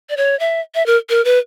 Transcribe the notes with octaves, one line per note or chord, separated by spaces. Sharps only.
D5
C#5
E5
E5
A#4
A#4
B4